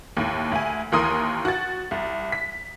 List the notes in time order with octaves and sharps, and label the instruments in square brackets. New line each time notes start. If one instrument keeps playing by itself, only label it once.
[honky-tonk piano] D#2 A2
D2 G#5
D#2 E3 A#4 C6 D#6 D#7
F#4 A6
C2
B6